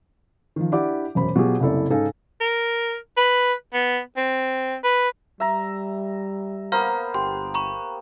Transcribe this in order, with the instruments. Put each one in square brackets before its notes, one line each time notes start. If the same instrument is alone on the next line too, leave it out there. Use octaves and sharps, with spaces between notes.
[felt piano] D#3 F3
D4 E4 G4 D5 F#5 D6
E1 F#2 C5 B5
B2 F#3 F4 G4 G#4
F#1 C2 E4 A4 D5
G#2 C#3 D#4 A4 F5 G#5
[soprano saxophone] A#4
B4
B3
C4
B4
[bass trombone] G3 [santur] E5 A#5
[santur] A#3 B3 C5 [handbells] F5 A#5 F6
[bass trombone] G1 [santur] G4 [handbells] C6
[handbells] A#5 B5 C#6